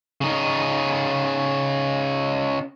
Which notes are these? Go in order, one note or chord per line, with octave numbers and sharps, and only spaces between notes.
C#3 D#4